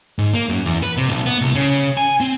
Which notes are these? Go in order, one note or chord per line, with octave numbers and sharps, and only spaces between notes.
G#2
A#3
F#2
E2
B4
C3
B1
B3
C2
C#3
G#5
C4